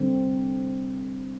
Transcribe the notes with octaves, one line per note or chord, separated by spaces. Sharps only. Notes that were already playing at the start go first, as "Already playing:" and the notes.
Already playing: D3 G3 C4